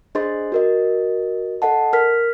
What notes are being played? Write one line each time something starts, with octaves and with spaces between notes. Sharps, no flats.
D4 G#4 C5 D#5 C6 A6
F#4 A#4 D#5
A4 D#5 F#5 A5
A#4 F6 B6